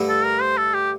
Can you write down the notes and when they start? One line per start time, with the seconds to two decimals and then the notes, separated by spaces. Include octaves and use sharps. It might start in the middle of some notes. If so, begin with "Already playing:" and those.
Already playing: G2 D3 A3 E4
0.09 A4
0.25 A#4
0.41 C5
0.58 A4
0.74 G4